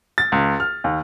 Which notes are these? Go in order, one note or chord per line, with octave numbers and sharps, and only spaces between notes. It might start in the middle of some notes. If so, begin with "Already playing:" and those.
A6
C#2
F6
D#2